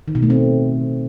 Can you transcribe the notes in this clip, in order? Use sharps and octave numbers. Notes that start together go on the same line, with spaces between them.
D#3
B2
A3
C4